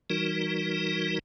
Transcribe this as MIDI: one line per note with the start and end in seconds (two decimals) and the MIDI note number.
0.10 1.19 52
0.10 1.19 55
0.10 1.19 63
0.10 1.19 66
0.10 1.19 70